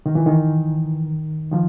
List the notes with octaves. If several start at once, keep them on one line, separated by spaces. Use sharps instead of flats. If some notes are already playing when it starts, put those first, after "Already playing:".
D#3
E3
D#3
D#3 F3